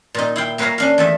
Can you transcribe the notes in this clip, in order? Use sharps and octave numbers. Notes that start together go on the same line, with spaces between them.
A#2 D#4
E4 F5 G5
A#3 B4 C#5 E5 F5 A#5
C#4 D4 F5
E2 A3 E5